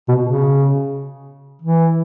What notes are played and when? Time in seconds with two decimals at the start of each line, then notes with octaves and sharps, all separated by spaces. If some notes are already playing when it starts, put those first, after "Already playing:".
0.09 B2
0.25 C#3
1.62 E3